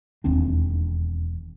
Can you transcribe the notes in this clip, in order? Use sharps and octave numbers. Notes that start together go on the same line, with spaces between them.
E1 D#2 C4 D4